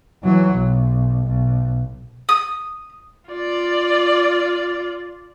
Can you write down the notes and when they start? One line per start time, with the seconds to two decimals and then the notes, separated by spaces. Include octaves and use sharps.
0.23 E3 F#3
0.52 B1
1.27 B1
2.29 D#6
3.30 F4 D5